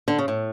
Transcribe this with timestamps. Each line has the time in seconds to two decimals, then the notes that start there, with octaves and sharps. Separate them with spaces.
0.08 D3
0.19 C#3
0.28 A2